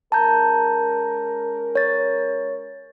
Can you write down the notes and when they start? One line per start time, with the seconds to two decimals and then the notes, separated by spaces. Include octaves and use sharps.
0.12 G#3 C#4 A#4 A5 A#5 G6
1.75 C#5 A6